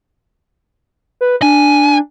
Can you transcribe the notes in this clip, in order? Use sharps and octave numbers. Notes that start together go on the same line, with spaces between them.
B4
D4 G#5